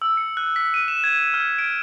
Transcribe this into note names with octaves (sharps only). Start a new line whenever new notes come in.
E6
C#7
F#6
B6
D#7
E7
G#6
F6
D7